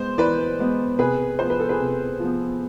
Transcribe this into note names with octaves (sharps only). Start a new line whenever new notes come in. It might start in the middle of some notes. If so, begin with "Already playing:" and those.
Already playing: G#3 B3 C5
E3 B4 D5
G#3 B3
C3 G#4 B4
F3 B3 C5
B4
A4
G#4 B4
C3
F3 B3